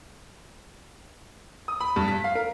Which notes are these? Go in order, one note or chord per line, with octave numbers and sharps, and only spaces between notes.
D#6
B5
G2
B6
F5
A#4